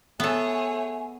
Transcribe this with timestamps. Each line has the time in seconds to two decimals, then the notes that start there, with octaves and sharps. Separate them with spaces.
0.20 A3 B3 G#4 A4 C#5 G#5